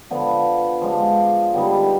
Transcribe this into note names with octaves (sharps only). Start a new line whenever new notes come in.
D3 F3 B3
F3 G#3 D4
D3 G3 B3 D#4